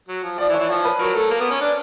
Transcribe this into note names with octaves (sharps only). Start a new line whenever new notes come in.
F#3
F3
F3 D5
E3
C#5
E3
F3 C#5
B4
F#3 A#4
A3
A#3
B3
C#4
D4